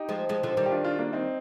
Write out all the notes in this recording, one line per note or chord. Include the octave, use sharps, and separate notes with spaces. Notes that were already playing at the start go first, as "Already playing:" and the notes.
Already playing: D#4 G4
F3 G#3
F3 G#3
D3 F3
D#3 G3
G4
D4 F4
D4 F4
A#3 D4
C4 D#4